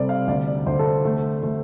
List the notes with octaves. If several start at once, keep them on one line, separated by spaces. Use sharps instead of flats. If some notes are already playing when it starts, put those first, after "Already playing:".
Already playing: C3 G3 A4 C5 D5
F5
D2 D5
D5
D2 C5
A4
C5
A3
A3